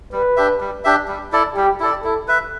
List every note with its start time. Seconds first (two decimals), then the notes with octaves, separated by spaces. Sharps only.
0.12 G3 B4
0.37 D4 G4 E5
0.61 G3
0.84 D4 G4 E5
1.08 G3
1.32 E4 A4 D5
1.56 G3 G4
1.80 E4 A4 D5
2.04 E4 A4
2.28 B4 E5